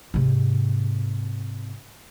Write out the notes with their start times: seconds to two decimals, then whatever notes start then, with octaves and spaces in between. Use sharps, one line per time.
0.14 G#2 C3